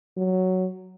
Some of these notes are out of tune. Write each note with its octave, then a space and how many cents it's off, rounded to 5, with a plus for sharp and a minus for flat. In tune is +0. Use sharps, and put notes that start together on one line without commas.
F#3 +5